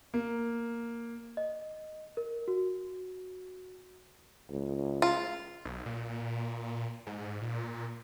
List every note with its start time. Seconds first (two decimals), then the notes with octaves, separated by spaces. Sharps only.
0.14 A#3
1.37 D#5
2.17 A#4
2.48 F#4
4.50 C#2
5.02 F4
5.65 B1
5.86 A#2
7.07 G#2
7.41 A#2